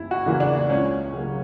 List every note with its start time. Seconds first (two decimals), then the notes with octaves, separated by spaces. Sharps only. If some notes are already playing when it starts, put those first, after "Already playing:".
Already playing: F#1 E2 C#3 E4
0.11 F#4
0.26 E2 C#3 E3 A#3
0.40 D4
0.69 C#2 C#4
1.14 C#3 F#3 A#3